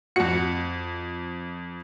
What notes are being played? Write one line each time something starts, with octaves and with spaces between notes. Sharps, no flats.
F2 F#4 C#7